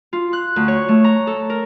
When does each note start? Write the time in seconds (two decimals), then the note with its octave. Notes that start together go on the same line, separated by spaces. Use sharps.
0.13 F4
0.33 F#6
0.56 D2
0.68 C#5
0.89 A3
1.04 A#5
1.27 A4
1.50 A#4